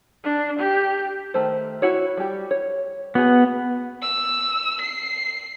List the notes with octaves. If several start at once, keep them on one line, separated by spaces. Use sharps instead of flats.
D4
G4
D#3 A3 C5
E4 F#4 C#5
G3 G4
C#5
B3 F#4 G#4
E6
C7